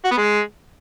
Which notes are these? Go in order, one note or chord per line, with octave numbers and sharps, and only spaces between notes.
F#4
B3
G#3